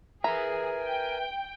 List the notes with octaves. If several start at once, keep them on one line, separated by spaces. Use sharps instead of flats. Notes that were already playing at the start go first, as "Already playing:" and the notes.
G#4 A#4 B4 E5 G#5 A#5
G5